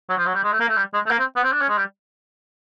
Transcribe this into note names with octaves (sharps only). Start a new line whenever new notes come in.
F#3
F3
F#3
G3
G#3
A3
A#3
A3
G3
G#3
A3
A#3
C4
B3
C4
D4
C#4
G#3
G3